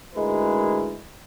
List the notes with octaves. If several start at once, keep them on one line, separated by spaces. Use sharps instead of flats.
D2 G#2 G#3 E4 A#4 B4